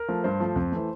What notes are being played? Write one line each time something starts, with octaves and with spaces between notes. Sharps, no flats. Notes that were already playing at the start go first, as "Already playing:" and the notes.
Already playing: A#4
F3 A3
G2 C5
F3 A3
F2
E3 A3